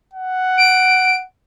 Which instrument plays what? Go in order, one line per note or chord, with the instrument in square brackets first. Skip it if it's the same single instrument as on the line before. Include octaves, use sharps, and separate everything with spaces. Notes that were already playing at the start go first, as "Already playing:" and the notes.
[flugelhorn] F#5
[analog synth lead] D7